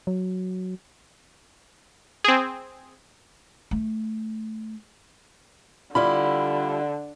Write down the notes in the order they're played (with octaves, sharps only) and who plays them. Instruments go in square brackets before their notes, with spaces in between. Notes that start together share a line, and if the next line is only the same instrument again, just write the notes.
[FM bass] F#3
[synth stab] C4 G#4
[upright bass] A3
[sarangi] D3 [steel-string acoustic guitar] G3 E4 F4 [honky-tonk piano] B5